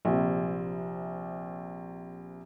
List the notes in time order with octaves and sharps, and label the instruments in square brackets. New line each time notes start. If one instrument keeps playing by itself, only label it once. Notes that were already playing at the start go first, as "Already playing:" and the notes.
[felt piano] A#1 C3